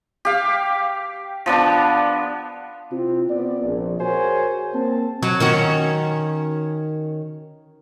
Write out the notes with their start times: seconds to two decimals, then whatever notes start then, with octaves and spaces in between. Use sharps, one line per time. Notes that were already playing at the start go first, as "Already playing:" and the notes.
0.25 G4 F5
1.46 F3 B3 D4
2.91 C3 C4 E4 F4
3.30 B3 C4 F4 D5
3.62 A#1
4.00 F#4 G#4 A#4 C5 C#5 G#5
4.74 A#3 C4 A5
5.23 F#3
5.40 D#3 C#4 F#4